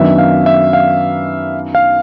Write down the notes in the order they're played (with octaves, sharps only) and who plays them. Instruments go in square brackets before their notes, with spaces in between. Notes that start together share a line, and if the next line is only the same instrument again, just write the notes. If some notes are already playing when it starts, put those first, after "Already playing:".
Already playing: [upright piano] F#2 D#3 F#3 B3 D4 [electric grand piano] E5
[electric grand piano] F5
E5
F5
F5